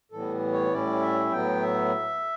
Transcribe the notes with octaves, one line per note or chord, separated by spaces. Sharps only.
A2 E3 G3 B3 A4
C#5
A2 G3 C#4 E4 D5
E5
A2 F#3 B3 G5
E5